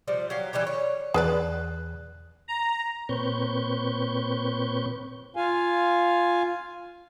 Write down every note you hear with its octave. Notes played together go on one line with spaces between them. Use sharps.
C3 F3 G3
F#3 G4 F5
E3 G3 D#4 G4
C#5
E2 G#4 B4 D5 F#6
A#5
A#2 C4 B4 C#5 C#6 G6
F4 F5 G#5